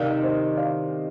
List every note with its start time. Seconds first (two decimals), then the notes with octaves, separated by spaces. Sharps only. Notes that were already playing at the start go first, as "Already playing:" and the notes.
Already playing: C3 D#3 D5 F5
0.23 C5 D#5
0.57 D5 F5